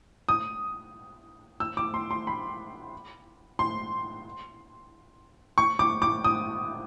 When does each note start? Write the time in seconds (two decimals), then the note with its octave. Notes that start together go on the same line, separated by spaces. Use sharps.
0.29 D#6
1.60 E6
1.77 D6
1.94 C6
2.11 C6
2.27 B5
3.59 C6
5.58 C#6
5.79 D6
6.02 D6
6.24 D#6